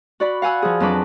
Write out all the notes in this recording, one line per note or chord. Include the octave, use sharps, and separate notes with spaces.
F#4 D5 B5
F5 F#5 G#5 E6 F#6
F3 G#4
F2 F#3 D4 B4 D6